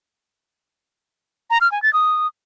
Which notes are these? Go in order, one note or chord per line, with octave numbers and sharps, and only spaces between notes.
A#5
F6
G#5
A6
D#6